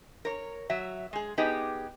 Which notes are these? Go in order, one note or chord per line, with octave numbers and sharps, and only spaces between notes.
A#4 C#5
F#3 E5
G#3 G#4
B3 D#4 G4 G#4